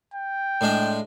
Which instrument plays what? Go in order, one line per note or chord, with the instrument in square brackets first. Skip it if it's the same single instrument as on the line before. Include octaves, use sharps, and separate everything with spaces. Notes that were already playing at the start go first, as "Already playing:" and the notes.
[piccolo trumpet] G5
[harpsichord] A2 G#3 D4